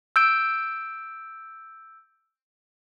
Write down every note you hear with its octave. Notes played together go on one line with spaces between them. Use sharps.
E6 G6 D7